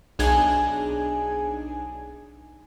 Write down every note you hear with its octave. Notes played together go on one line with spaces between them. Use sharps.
B1 D4 D#4 G#4 G#5 G#6